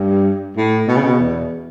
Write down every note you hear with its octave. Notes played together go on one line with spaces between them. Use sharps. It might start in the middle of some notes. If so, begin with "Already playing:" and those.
Already playing: G2
A2
B2
C#3
B2
E2